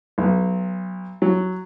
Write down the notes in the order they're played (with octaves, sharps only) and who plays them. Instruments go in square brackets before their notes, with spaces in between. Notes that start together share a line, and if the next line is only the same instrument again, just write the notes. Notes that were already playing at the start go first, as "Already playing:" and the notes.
[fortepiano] B1
F#3